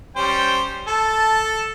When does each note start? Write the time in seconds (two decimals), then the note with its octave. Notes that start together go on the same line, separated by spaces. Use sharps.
0.16 G3 C#4 C5 G5
0.87 A4 A5